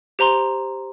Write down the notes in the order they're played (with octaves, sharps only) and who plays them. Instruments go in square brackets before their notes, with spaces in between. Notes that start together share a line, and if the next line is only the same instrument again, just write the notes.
[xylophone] G4 C5 A#5 C6